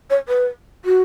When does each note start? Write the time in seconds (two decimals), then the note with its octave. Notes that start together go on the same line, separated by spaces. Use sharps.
0.10 C#5
0.28 B4
0.85 F#4